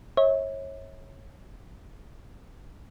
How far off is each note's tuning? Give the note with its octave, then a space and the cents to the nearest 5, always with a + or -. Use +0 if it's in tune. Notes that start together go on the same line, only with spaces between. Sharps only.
C#5 -25 E5 -40